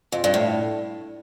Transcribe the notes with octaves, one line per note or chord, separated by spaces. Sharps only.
F2
G2
A2